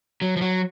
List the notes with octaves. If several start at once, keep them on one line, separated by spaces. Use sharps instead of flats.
F#3
F3
F#3